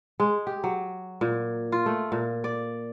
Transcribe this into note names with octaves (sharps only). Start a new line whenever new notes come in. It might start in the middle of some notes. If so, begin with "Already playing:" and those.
G#3
G4
F#3
A#2
F4
A3
A#2
D5